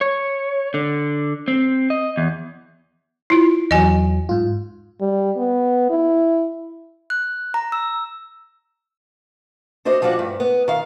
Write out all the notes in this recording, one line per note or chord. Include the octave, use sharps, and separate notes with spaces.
C#5
D3
C4
D#5
E2
E4 F4
E2 F#3 D#5 G#5
G#2 F4
G3
B3
E4
F#6
A#5
E6
D4 F#4 C5 D#5
F3 G3 D4 F4 F#4
G2 A3
B3
D#3 F5